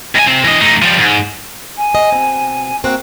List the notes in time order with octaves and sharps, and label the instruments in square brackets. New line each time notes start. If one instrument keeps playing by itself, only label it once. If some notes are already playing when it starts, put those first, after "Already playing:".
[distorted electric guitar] C#2 G#5
C3 C4
E3 D#5
A3 D#4
F3 G3
G#2
[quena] G#5
[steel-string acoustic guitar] D#5
B2 C4
[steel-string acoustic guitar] A#3 C4 F#4 [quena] F#6